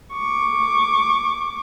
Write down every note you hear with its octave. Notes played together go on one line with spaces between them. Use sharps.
C#6 D6